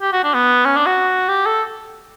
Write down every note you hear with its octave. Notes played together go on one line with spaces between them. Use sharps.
G4
F#4
D4
B3
C#4
D4
F#4
G4
A4